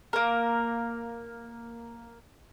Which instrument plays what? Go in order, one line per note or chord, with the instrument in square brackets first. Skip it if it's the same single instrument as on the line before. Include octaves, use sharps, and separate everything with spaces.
[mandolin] A#3 A#4